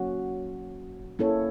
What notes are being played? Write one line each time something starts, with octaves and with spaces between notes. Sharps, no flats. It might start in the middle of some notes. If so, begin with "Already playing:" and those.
Already playing: F#3 A#3 C#4 F#4
A#3 C#4 E4 A4 C#5